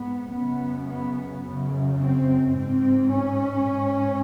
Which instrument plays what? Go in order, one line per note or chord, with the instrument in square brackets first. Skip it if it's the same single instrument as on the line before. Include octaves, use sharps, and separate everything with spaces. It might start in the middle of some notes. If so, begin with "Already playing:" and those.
Already playing: [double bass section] G#2 B3
F#2 C#3 B3
B3
F#2 C#3
C4
G#2 C4
C#4
G#2